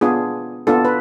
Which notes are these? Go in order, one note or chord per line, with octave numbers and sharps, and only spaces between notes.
B3 D4 F4 G#4
B3 D4 F4 A4
B4